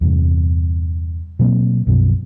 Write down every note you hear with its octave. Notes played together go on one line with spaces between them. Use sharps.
E2 G2 C3
B2 F#3 A#3 C4
B1 F#2 B2 F3